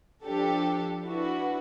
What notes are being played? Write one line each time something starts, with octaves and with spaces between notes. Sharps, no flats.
F3 D4 G4 A4
D4 E4 F#4 B4